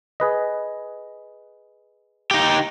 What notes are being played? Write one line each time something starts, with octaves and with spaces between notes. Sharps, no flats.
G#4 B4 D#5
D#4 G4